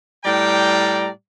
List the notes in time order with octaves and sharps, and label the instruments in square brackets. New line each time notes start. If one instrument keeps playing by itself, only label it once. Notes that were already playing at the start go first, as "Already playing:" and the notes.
[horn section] A2 G3 D5 G5 A#5